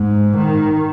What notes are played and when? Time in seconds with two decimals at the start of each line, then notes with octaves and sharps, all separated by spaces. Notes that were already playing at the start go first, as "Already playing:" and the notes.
Already playing: G#2
0.36 D#3